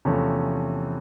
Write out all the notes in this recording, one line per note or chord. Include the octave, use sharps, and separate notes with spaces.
E2 C3 F3 A3 C#4